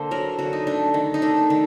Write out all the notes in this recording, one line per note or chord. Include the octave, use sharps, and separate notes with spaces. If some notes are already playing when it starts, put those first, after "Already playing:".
Already playing: D3 A#3 C5
F#3 A#4
D3 F#4
D#4
A3 D4
D#3
D#4
A3 D4
D#3